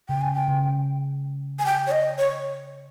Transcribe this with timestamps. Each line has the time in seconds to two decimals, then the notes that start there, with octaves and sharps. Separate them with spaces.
0.09 C#3 G5
0.21 G#5
0.34 G5
0.48 C#3
1.59 G#5
1.66 G5
1.87 C#5
1.91 D#5
2.18 C#5